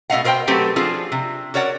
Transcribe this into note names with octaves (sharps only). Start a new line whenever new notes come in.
B2 A3 C#4 D#5 F5 F#5
B2 A#4 C5 E5 G5
F#3 A3 C4 G4 A4 B4
F3 C4 D4 F4 G#4
C3
F#4 A#4 C#5 D5 F#5